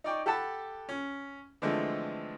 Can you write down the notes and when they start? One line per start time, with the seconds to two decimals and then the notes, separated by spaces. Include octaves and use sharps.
0.04 D#4 D5 G5 C#6
0.26 G4 A4 F#5 A5 B5 E6
0.89 C#4
1.62 D3 E3 F3 G#3 A3 C4